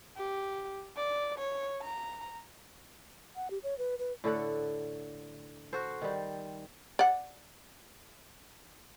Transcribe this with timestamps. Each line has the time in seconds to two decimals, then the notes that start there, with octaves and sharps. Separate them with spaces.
0.17 G4
0.96 D5
1.38 C#5
1.82 A#5
3.36 F#5
3.51 G4
3.63 C#5
3.78 B4
3.99 B4
4.24 A2 D3 A4 F#5
5.73 F#4 A4 C5
6.02 D#3 G3
6.99 D5 F#5